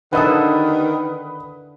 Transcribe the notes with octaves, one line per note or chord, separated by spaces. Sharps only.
D3 D#3 E4 A4 B4 D#6